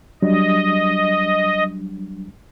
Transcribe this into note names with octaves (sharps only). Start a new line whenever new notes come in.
F#3 G3 D4 D#5